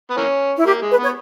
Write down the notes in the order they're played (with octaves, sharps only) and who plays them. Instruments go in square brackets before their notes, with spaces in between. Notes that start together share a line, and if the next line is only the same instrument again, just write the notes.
[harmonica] B3
E3 A#3 C#4
[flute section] E4
[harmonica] A#3 [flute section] G4
[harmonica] G#3
[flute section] B4
[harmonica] B3 [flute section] C#5